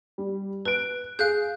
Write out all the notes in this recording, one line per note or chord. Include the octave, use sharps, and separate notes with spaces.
G3
B4 F#6 D7
G#4 F5 F#6 G6